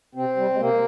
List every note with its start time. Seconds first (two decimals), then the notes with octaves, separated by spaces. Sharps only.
0.15 C3 C4
0.37 G3
0.54 G#3
0.59 C3 A#3